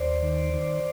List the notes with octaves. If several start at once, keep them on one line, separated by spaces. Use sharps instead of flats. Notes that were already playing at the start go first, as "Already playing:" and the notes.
Already playing: D#2 C5 D5
D#3
D#3